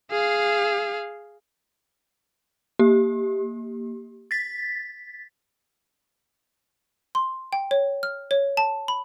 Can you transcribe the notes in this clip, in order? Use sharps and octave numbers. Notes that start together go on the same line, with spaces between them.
G#4 F5
A#3 G4
A6 B6
C6
G5
C#5
F6
C#5
A5
B5